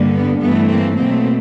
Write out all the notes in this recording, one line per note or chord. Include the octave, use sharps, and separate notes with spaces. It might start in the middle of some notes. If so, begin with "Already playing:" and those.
Already playing: G2 D3 G3 A#3
B3
G2 E3 A3 B3
A#3 C4
B2 F#3 A3 A#3 C4